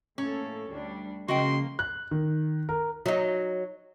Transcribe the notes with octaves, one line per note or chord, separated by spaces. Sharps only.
A2 A#3 C#4 A4
D2 G3 D4
C#3 F3 G#3 A#3 F#4 D#5 G5 C6
F#6
D#3
A#4
F#3 D#4